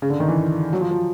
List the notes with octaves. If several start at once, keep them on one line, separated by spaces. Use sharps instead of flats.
C#3
D3
D#3
E3
F#3
F3
F3